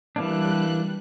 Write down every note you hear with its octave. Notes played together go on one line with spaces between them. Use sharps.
E3 G3 A#3 D4 F#6